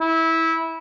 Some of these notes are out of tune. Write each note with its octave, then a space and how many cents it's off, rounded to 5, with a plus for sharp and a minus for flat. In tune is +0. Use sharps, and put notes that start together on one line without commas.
E4 -20